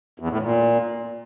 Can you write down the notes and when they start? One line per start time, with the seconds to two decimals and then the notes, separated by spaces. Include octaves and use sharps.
0.20 E2
0.31 A2
0.42 A#2